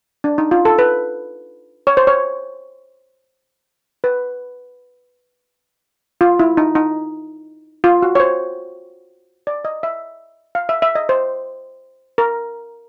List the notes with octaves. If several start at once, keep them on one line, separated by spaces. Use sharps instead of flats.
D4
D#4
F4
A4
B4
C#5
C5
C#5
B4
F4
E4
D#4
D#4
F4
F#4
C#5
C5
D5
D#5
E5
F5
E5
E5
D#5
C5
A#4